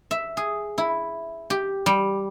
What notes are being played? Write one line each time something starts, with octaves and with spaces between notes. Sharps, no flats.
E5
G#4
E4
G4
G3